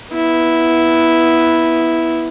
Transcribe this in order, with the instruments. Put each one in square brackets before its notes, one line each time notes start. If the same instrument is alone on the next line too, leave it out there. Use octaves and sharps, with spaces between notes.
[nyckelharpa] B3 E4